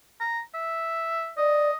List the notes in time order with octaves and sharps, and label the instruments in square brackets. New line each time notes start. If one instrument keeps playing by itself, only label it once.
[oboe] A#5
E5
[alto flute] D5 [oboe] D#5